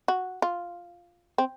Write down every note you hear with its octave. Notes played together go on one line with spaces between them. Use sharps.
F#4
F4
C4